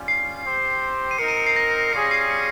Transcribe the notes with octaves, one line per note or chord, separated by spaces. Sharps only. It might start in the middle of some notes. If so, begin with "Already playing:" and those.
Already playing: G3 C#4 F4
C7
C4 G4 C5
D#7
C4 D#4 A#4 C#7
D#7
C#7
C7
A#6
G3 C#4 F4 G#4 C7
A#6
C7
C#7